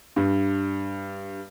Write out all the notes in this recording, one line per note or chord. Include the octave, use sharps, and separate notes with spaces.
G2